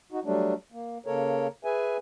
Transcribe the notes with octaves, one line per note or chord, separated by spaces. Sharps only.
D#4 F#4
F#3 G3 A3 D4
A#3
C#3 A#3 A4 A#4 C#5
G#4 B4 E5 G#5